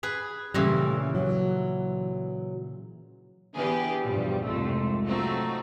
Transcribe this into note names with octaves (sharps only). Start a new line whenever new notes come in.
G#4 B4
A#2 C#3 E3 G3 A3
F#3
D3 E3 B3 G4 G#4 B4
E2 G2 B2 F3 G3
C2 F2 G#2 G#3 A3
F3 F#3 A3 C4 D#4 F#4